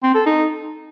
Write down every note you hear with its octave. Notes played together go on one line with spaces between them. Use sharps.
C4
A4
D#4